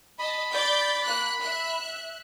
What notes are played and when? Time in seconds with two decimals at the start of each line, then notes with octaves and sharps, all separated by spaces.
0.19 D#5 A5 B5
0.52 D5 G6 A6
1.04 A#3 F#6
1.41 E5 F#6